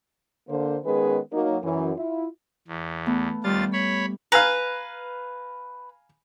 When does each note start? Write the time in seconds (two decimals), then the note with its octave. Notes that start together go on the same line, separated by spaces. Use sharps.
0.49 D3 A#3 C5
0.85 D#3 G#3 B3 C#4 G#4 B4
1.33 F#3 A#3 D#4
1.63 F#2 E3
1.96 E4 F4
2.68 E2
3.06 A3 B3
3.44 D#2 G3 F4 A6
3.73 C#5 B5
4.32 B4 F5 G#5 A#5